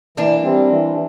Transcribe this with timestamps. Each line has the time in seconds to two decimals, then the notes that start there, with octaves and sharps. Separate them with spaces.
0.17 E3 A#3 D4
0.43 G3 C4
0.70 E3